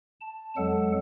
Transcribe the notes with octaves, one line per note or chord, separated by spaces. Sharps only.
A5
F2 F#3 G#3 A4 F#5